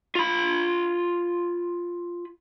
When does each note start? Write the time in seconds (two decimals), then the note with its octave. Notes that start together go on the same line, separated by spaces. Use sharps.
0.15 F4 B5